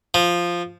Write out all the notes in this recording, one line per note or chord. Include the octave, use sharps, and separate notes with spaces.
F3